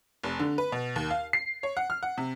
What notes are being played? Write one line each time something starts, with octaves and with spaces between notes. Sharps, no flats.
F1
D3
B4
B2
D#2
F5
C7
C#5
F#5
F6
F#5
C3